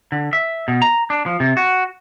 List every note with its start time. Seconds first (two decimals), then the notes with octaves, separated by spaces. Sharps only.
0.12 D3
0.33 E5
0.68 B2
0.82 A#5
1.10 D4
1.26 F3
1.40 C3
1.57 F#4